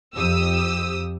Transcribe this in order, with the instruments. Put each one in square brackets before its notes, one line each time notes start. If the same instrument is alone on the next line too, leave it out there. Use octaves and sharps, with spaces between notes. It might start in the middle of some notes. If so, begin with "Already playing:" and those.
[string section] F2 G4 D#6 E6